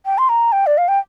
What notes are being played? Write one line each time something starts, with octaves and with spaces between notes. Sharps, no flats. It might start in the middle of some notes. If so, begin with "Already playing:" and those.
G5
C6
A#5
G5
D5
F5
G5